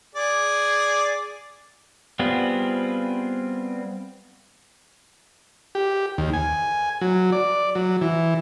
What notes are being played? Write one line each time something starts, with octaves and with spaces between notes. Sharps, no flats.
G#4 D5
G3 B3 C4 F4 G#4
G4
D#2
G#5
F#3
D5
F#3
E3